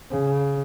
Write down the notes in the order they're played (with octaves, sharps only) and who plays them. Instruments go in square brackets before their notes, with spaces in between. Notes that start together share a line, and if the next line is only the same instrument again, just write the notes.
[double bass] C#3